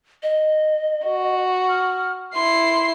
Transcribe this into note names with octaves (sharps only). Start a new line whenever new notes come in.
D#5
F#4
F6
E4 C6 C7